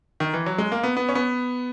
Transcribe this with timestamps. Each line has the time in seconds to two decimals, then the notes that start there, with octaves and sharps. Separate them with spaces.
0.20 D#3
0.34 E3
0.46 F#3
0.58 G#3
0.72 A#3
0.83 B3
0.97 B3
1.09 C#4
1.15 B3